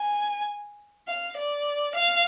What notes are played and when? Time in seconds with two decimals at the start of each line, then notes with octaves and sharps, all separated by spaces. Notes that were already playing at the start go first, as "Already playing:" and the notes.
Already playing: G#5
1.08 F5
1.37 D5
1.95 F5